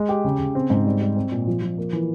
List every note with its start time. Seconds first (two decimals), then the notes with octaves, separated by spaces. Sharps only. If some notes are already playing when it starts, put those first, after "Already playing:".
Already playing: G#3
0.09 G4
0.25 C#3
0.39 C#3
0.55 C4
0.70 G#2
0.86 G3
1.01 G3
1.16 C4
1.32 A#2
1.48 F3
1.62 F3
1.78 A#3
1.93 E3